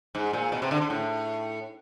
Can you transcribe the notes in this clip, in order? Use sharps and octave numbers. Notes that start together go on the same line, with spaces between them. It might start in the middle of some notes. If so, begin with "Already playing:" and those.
G#2
A#2
B2
C3
D3
D3
A2